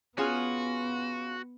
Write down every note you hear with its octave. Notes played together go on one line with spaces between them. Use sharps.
B3 C#4 F4 F#4 G#4